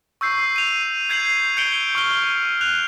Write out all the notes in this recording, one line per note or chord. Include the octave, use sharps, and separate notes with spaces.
C#6 E6 G6 C7
D#7 F7
G6 G#6 C7 D#7 F7 F#7
G6 C#7 D7 F#7 G7
C#6 F6 G7
F#6 F7